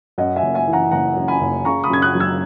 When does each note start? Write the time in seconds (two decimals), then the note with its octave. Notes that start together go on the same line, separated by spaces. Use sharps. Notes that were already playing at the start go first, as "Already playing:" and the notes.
0.18 F#2 D#5 F#5
0.36 E5 G#5
0.43 F#1
0.54 E5 G#5
0.67 E3
0.73 F#5 A#5
0.91 F#1 F#5 A#5
1.16 F#2
1.28 G#5 B5
1.41 F#1
1.65 C#3 A#5 C#6
1.84 B5 D#6
1.90 F#2 G#6
2.02 D#6 F#6
2.15 F#3
2.20 E6 G#6